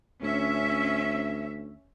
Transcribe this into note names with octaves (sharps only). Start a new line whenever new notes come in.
D2 C#4 E5